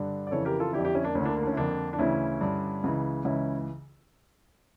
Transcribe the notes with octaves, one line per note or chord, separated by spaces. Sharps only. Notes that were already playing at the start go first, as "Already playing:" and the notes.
Already playing: G2 D3
D5
F2 C#3 E3 A4 C#5
G4 A#4
F4 A4
D3 E4 G4
F2
E4 G4
C#4 E4
A#3 D4
D2 D3 C#4 E4
A#3 D4
A#3
D4
C#4
E4
F2 D3 A#3 D4
D4
D2 C#3 E3 C#4 E4
G2 D3
C#2 C#3 E3
C#2 C#3 E3 C#4 E4